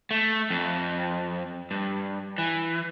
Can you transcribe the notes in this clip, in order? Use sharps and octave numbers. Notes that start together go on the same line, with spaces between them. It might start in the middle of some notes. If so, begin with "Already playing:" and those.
A3
F2
G2
E3